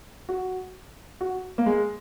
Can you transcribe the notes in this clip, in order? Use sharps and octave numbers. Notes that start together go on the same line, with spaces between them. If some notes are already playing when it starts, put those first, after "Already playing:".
F#4
F#4
A#3
G#3